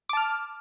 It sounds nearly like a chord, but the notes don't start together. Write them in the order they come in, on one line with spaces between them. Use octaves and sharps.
D6 A5 F6